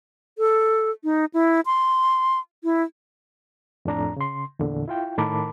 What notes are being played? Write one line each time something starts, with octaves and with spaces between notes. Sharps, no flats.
A4
D#4
E4
C6
E4
F2 A2 D4 A#5
C#3 C6
E2 A#2 D3
E4 F4 G5
A2 D#3 A#4 A5 B5 D6